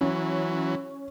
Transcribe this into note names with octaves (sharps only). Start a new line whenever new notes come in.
E3 F#3 C#4